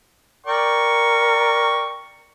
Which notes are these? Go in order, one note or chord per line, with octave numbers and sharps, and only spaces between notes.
A#4 D5 G5 C#6